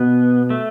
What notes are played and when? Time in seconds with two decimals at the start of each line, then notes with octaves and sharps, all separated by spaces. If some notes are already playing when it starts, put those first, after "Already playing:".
Already playing: B2 B3
0.50 A3